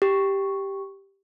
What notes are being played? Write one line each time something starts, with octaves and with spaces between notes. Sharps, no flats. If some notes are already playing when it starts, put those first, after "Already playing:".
G4